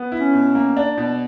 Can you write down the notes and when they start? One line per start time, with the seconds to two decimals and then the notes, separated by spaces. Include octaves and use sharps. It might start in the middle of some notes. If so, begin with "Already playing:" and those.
Already playing: B3
0.12 E4
0.20 C#4
0.34 B2
0.55 A#3
0.77 D4
0.97 B2